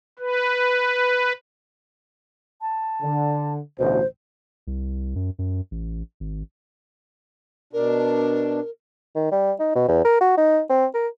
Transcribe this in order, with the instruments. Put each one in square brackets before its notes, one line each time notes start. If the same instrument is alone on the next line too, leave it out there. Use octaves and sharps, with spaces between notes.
[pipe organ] B4
[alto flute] A5
[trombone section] D3
[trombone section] A1 D2 B2 [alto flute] C5
[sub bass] C2
F#2
F#2
A1
G#1
[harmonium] B2 D4 [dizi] A#4
[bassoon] D#3
G3
D#4
B2
E2
A#4
F#4
D#4
C4
A#4